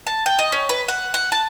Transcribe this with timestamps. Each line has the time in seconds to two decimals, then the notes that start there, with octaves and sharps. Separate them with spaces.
0.07 A5
0.26 G5
0.39 D#5
0.52 C#4
0.69 B4
0.88 F#5
1.14 F#5
1.32 A5